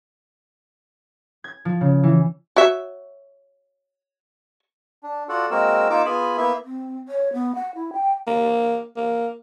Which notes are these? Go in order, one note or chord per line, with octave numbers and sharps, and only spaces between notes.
G#6
F3
C#3
E3
F#4 C#5 E5
D4
F4 F#4 A4 D5 F#5
G#3 A#3 C4 F#4 A#4 E6
A#3 D#4 F4 D6 E6
B3 F4 G#4 G#5 B5
A#3 B3 E4 E5
C4
C#5
B3
F#5
E4
G5
A#3
A#3